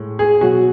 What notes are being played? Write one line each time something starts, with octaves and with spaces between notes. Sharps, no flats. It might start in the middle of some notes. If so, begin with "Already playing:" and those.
Already playing: A2 G#3
G#4
B2 F#3 F#4